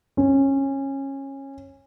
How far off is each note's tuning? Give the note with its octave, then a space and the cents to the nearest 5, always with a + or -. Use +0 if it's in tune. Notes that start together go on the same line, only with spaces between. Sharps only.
C#4 -20